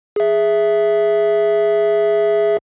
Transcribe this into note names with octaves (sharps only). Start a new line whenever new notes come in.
G#4 E5